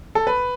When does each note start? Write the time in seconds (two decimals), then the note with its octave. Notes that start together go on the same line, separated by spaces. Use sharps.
0.15 A4
0.27 B4